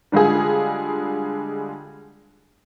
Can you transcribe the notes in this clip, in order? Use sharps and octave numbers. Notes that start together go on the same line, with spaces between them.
D3 G3 G#3 F4 G#4